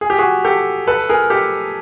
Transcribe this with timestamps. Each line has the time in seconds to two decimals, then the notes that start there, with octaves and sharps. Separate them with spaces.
0.01 G#4
0.10 G4
0.18 F#4 G#4
0.45 G4 A4
0.87 A4 B4
1.09 G#4 A#4
1.30 G4 A4